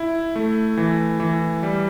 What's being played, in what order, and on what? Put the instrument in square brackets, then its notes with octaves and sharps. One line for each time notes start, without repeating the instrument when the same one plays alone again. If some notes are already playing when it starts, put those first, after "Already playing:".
Already playing: [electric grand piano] E4
A3
E3
E3
G3